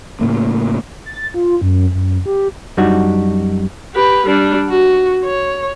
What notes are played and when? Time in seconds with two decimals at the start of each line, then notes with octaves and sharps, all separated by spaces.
0.21 A2 C#3 A#3
1.06 A6
1.34 F4
1.61 F#2
1.93 F#2
2.26 G4
2.77 F#2 G3 D4 D#4 F#4
3.95 G4 B4
4.26 G3 D4
4.69 F#4
5.24 C#5